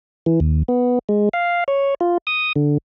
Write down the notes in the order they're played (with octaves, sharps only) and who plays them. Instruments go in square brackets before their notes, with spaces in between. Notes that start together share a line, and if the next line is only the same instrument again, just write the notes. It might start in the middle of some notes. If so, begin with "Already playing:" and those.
[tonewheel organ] E3
D#2
B3
G#3
F5
C#5
F4
D#6
D3